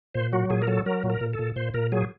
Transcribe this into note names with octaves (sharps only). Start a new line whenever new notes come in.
A#2 C5
F#3 F#4
A#2 G#4
A#4
F#3 A4
F#3 A#4
A#2
A#4
A#2
A4
A#2
A#2 C5
A#2 A#4
F#3 G#4